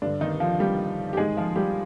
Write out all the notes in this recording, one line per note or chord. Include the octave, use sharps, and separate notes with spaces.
G2 D3 D4
D#3 D#4
F3 F4
G3 G4
G4
G#2 D#3 G#3 G#4
F3 F4
G3 G4